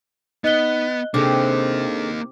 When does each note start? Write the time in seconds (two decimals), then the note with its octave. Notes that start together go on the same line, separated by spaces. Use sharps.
0.44 B3 D#4 D#5 F#6 G7
1.14 C3 A#3 D4 D#4 G#4 A4 D6